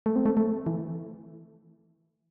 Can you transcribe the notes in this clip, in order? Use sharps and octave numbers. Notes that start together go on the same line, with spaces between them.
A3
C4
A3
A3
E3